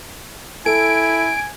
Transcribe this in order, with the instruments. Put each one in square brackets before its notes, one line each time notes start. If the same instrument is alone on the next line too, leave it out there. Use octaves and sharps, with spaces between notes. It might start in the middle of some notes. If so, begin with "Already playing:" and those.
[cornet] E4 [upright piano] A4 [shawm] G#5 [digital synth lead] D7